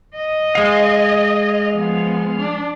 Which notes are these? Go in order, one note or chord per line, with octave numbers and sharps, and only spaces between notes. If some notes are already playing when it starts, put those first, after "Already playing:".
D#5
G#3 F5
F3 B3
D4